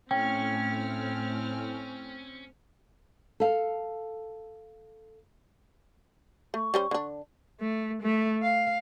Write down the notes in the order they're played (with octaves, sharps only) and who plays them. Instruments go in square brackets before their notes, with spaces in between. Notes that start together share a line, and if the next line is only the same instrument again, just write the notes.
[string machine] A2 F6 [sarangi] C4 [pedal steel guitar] C#4 [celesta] G5
[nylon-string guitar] A4 F5
[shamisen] A3 [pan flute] C#6
[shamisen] G3 C#4 C5
D3 D4
[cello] A3
A3
F5